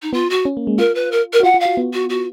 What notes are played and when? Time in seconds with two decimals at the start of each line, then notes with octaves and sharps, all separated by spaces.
0.02 D#4
0.13 B3 F4
0.30 F#4
0.45 C#4
0.57 A#3
0.67 G#3
0.78 F4 A#4
0.95 B4
1.12 A#4
1.33 A#4
1.40 F#4
1.43 F4 F#5
1.54 F4
1.60 F5
1.65 F#4
1.77 B3
1.93 F#4
2.09 F#4